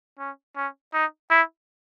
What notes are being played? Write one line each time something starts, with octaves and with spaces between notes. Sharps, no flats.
C#4
C#4
D#4
E4